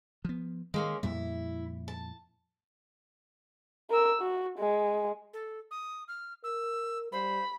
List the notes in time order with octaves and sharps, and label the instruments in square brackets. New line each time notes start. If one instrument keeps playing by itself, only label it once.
[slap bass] F3 B3
[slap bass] D#3 [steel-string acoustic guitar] G#3 A#3 C#4
[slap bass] F2 A#2 G3 [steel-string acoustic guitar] E4
[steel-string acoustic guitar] A5
[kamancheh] A#4 E6
F#4
G#3
[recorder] A4
D#6
F6
[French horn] A#4 [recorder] E6
[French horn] G3 [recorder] C5 [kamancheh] B5